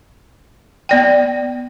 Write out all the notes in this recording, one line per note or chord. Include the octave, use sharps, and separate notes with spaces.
B3 D5 G5